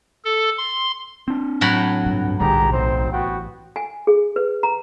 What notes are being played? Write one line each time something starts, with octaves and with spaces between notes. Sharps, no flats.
A4
C6
C4 D4
A2 F#3 B5
C#2 G2
F1 B1 B2 D3 G3 G4 G#4 A#5
A1 C4 D#4 C5
B3 F#4 G5
G#5
G#4
B4
A#5